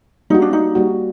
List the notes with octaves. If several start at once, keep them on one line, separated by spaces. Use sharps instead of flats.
G3 A#3 D#4 F#4
D4
D#4
G3 A#3 F#4